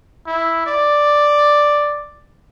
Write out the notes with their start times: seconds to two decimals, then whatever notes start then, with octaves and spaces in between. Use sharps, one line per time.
0.26 E4
0.66 D5